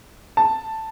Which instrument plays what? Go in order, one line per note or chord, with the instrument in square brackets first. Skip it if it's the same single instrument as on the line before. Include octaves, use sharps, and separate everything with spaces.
[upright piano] A5